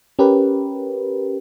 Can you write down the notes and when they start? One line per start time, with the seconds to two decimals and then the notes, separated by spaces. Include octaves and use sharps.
0.19 C#4 G4 A#4 B4